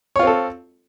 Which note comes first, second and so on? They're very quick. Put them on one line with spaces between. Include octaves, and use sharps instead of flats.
C#5 F4 C4 A4